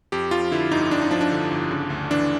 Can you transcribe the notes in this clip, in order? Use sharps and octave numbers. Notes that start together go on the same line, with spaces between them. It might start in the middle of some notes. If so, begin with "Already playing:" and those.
F2 G4
F3 F4
D3 E4
G1 D#4
F2 D4
D#4
F3 D4
D4
D3
G1
C#3
D2
E3 D4